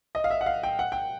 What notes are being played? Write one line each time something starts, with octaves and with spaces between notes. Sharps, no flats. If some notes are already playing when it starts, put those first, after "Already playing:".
D#5
F5
E5
F#5
F5
G5
F#5
G5